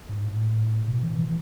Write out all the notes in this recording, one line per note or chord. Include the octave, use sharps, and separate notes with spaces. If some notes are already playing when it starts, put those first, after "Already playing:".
G#2
A2
B2
E3
E3